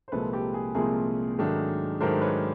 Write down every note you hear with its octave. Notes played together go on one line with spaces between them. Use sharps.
C5
C2 A#2 F3 G#3 A4 B4
G4 A4
G#4
C2 A#2 F3 G#3 G#4 A#4
G#2 D#3 F#3 A3 D4
G#2 D#3 F#3 A3 D4 A#4 C5
B4 C#5